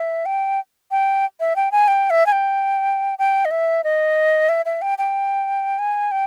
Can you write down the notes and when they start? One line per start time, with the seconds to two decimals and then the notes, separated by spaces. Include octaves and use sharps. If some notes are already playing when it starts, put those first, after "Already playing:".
Already playing: E5
0.26 G5
0.91 G5
1.40 E5
1.56 G5
1.72 G#5
1.88 G5
2.10 E5
2.26 G#5
2.32 G5
3.19 G5
3.45 D#5
3.51 E5
3.84 D#5
4.49 E5
4.66 E5
4.82 G5
4.98 G5
5.79 G#5
6.11 G5